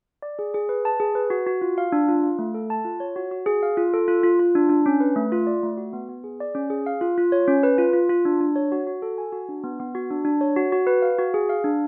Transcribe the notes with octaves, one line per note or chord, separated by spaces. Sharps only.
D5
G#4
G#4
B4
A5
G#4
B4
F#4
F#4
F4
F5
D4
F4
F5
A3
A4
A5
F4
C#5
F#4
F#4
G#4
F5
F4
A4
F4
F4
F4
D4
D4
C#4
B4
A3
F4
D5
A3
F#4
B3
B3
G#4
D5
C#4
G#4
F5
F4
F4
C#5
C#4
B4
F4
F4
F4
D4
D4
C#5
F#4
F#4
A4
G#5
F#4
D4
B3
B3
F#4
D4
D4
C#5
F#4
F#4
B4
F5
F#4
G#4
F5
D4